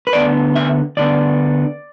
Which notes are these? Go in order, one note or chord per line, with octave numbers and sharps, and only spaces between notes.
B4
D2 D3 B3 D5
E5
D2 D3 B3 D5